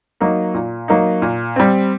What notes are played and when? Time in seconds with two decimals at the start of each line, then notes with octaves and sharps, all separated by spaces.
0.20 F#3 A#3 D#4
0.54 A#2
0.88 F#3 A#3 D#4
1.22 A#2
1.56 G3 C4